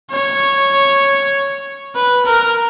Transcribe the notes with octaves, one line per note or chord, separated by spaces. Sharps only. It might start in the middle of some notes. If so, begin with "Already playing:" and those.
C#5
B4
A#4